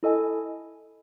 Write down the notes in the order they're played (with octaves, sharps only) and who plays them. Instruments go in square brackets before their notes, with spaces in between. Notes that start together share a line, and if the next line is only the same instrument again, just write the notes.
[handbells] E4 A4 D#5 G#5